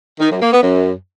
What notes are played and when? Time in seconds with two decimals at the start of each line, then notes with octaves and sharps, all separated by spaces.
0.20 D#3
0.31 F#2
0.41 A#3
0.52 B3
0.63 F#2